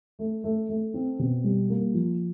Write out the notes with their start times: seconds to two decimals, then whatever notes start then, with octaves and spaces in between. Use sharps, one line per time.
0.19 A3
0.44 A3
0.69 A3
0.94 C4
1.19 B2
1.44 G3
1.69 A#3
1.94 F3